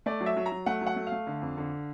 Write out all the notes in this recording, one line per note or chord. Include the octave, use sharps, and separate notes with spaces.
A3 D5
F#3
E5
F#3
A#5
F#3
A3 F#5
F#3
F#5
A3
F5
A3
D3
F2
D3